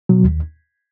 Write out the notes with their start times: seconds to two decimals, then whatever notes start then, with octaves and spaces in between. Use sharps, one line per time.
0.09 B2 F#3
0.24 D#2